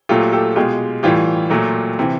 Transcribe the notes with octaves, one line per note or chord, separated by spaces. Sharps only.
A#2 F#3 A3 F4 G4
G4 A4
B2 G#3 F4 G4
A2 E3 G3 F4 G4
A#2 F#3 A3
C3 E3